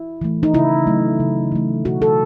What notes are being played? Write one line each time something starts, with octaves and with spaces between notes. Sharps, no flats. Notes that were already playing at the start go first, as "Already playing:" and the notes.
Already playing: E4
E3 A3
D#4
C#3 E4
F#3 A3
C#3
E3 A3
B2 F#4
A4